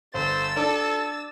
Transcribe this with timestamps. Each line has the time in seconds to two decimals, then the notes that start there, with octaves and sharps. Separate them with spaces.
0.14 G1 C5 E6 A6
0.56 D4 A4